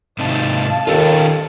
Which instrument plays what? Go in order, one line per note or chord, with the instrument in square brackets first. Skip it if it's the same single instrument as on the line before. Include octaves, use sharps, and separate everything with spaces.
[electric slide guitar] G#2 C3 D#4 [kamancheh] F5 A5
[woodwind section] D#2 [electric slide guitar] D#3 C#4 F4 [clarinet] A4